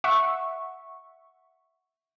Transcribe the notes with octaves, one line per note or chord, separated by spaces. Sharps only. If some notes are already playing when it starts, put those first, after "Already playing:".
E5 F#5 C#6